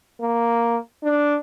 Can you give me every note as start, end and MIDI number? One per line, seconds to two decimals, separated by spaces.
0.21 0.77 58
1.03 1.37 62